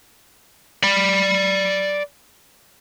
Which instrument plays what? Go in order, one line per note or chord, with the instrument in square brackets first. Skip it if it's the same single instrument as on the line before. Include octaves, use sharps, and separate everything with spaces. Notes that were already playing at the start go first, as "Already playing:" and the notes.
[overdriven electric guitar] D5 B5